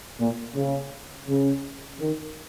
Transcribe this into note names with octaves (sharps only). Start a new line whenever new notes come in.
A#2
C#3
C#3
D#3